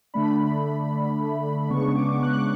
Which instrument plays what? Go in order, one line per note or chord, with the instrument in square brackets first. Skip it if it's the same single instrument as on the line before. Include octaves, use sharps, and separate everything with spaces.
[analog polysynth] D3 A3 D4 B5
C#3 G#3 B3 D4 C#6
D6
F#6